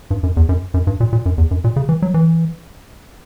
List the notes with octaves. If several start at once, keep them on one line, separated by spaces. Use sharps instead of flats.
G2
F#2
E2
F#2
F#2
G2
A#2
A#2
F#2
E2
F#2
A#2
C#3
E3
F#3
E3